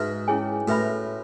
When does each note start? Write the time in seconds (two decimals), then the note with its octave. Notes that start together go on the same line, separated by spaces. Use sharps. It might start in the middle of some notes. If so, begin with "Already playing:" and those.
Already playing: G#2 D#4 F#4 B4 E5
0.28 C#4 E4 G#4 C#5 G#5
0.68 A2 F#4 B4 E5 B5